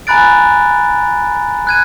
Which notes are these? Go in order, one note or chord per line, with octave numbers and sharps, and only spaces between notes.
G#5 A#5 B5 F#6 A6 D7
F#6 G#6 D#7